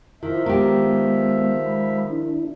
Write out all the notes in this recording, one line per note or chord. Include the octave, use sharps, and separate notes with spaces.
D#3 F3 E4 F4 E5
D#3 G#3 B3 G4
G#3 B5
D4 E4